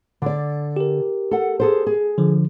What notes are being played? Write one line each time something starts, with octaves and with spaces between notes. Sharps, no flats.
D3 D5
G4 A#4
A4 F#5
G#4 A4 C5
G#4
D3 F3